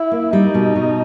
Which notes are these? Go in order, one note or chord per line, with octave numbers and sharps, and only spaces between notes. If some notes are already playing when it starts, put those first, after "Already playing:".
Already playing: E4
A#3
G3 D#4
B2
B2